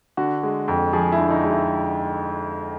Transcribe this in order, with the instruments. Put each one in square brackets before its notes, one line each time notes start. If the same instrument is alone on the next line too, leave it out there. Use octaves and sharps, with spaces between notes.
[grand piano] D3 F#4
G#3
F2
F3 G#4
E4
D3
D#4
G#3
E4